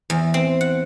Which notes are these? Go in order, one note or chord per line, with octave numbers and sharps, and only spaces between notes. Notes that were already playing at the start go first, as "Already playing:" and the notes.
E2
C4
F#5